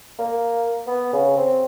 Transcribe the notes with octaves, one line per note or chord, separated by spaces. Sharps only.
A#3
B3
C#3
C4